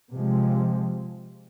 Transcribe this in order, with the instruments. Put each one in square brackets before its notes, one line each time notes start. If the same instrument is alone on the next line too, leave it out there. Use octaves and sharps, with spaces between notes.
[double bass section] C3 F3 G#3